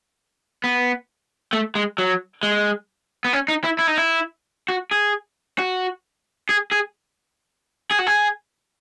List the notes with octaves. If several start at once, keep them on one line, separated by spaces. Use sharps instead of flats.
B3
A3
G#3
F#3
G#3
B3
C#4
D#4
E4
E4
D#4
E4
F#4
G#4
F#4
G#4
G#4
G#4
F#4
G#4